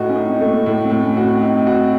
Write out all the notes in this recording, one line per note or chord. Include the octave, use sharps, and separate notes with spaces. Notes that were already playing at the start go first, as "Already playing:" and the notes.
Already playing: A2 A3 D#4 F#4
C#4
D#4
C4
A3
A#3
A2
C4
A2
C#4
F#4
C4
D#4
F#4